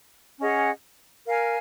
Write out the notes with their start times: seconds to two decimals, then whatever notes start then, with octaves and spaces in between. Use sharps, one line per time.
0.39 C#4 G#4 D#5 F#5
1.27 A#4 F5 G#5